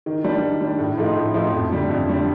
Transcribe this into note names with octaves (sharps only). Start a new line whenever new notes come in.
D#3
G3 D4
D#3
G3 D4
A2
F3 A3 D#4
A2
F3 A3 D#4
F2
D3 G3 D4
F2
D3 G3 D4